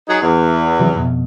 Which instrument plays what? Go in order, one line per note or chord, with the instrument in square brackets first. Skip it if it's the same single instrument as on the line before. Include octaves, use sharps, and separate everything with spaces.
[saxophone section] F#3 D#4 G#4
E2
[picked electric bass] C3 E3 F#3
F2 B2